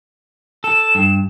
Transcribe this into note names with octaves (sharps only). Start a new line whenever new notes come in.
A4 E7
G2